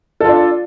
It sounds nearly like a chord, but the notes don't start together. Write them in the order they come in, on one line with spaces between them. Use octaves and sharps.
A4 F4 D4